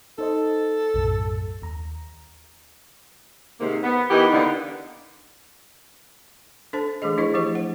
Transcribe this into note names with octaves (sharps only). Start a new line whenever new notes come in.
D#4 A4 C5 D#5
B1 F#2 A2
D#2 A#5
G#2 C3 D#3 A#3
B3
E3 B3 D#4 G4 A#4
D3 A#3 B3 D#4
D4 A4 C5 A5
E3 A3 D4 G#4 D#5
F3 D4 E4 G#4 B4 D#5
E3 F3 A3 G4 C5 D#5
F#5